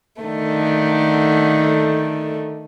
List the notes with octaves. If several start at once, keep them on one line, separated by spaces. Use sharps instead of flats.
D3 D#3 A3